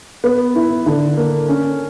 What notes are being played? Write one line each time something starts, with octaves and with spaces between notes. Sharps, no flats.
B3
E4
D3
A#3
C#4